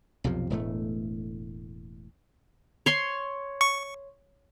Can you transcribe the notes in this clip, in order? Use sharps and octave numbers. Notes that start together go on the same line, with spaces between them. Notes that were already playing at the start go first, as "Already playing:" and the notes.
B1 F2 C3 F3
E1 A2 A3
C#5 C6
C#6